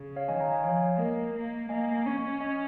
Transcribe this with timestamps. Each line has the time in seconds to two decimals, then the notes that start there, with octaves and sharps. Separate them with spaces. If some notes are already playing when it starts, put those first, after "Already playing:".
Already playing: C#3
0.16 C#5 F5
0.28 D#3 D#5 G#5
0.39 F5 A#5
0.51 D#5 G#5
0.64 F3 C#5 F5
0.98 A#3 A#4 D#5
1.34 A#3
1.69 A#3 D#5 G#5
2.06 C#4
2.40 D#5 G#5